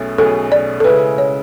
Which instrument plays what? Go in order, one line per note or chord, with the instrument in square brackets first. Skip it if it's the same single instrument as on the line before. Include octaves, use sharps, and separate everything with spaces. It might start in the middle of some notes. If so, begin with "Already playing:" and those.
Already playing: [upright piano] B1 B2 A3 C#4 G#4
[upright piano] B1 B2 A3 C#4 G#4 [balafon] A4
[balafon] D5
A4
[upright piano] C#3 G#3 C#4 E4 [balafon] B4
[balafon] C#5